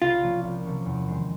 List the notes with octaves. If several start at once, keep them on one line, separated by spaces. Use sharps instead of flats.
C2 F4
C3 F3 A#3 C#4
C2
C3 F3 A#3 C#4
E2
C3 D#3 G#3 C4